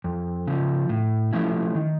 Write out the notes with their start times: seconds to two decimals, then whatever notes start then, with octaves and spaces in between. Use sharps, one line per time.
0.04 F2
0.48 C#3 F3
0.89 A2
1.33 F3 A3 C#4 E4
1.75 D#3